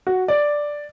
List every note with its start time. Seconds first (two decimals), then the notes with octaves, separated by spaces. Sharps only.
0.07 F#4
0.28 D5